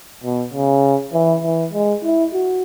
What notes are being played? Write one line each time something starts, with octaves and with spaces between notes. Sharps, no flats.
B2
C#3
E3
E3
G#3
E4
F#4